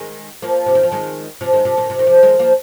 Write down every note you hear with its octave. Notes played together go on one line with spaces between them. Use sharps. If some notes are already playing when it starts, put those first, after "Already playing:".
Already playing: D#3 G#3
F3 A#3
C3
D#3
F3
D#3 G#3
C3 F3
D#3 G#3
C3 F3
A#2 D#3
C3
D#3
C3 F3
D#3 G#3
F3 A#3